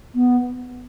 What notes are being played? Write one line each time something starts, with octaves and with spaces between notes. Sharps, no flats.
B3